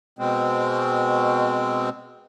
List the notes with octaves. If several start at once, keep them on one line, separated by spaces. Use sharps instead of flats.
B2 G#3 C4